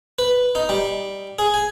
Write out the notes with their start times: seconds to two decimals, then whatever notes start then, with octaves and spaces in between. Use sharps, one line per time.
0.19 B4
0.55 D#4
0.69 G3
1.39 G#4
1.54 G#5